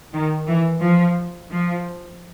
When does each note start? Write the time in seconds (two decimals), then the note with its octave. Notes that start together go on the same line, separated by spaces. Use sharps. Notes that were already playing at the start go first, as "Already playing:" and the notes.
0.13 D#3
0.47 E3
0.81 F3
1.51 F3